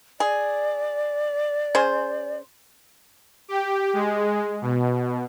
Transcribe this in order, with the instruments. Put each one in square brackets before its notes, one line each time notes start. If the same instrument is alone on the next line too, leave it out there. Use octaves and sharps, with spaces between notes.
[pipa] G#4 [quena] D5
[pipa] C#4 G#4 C5
[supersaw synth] G4
G#3
B2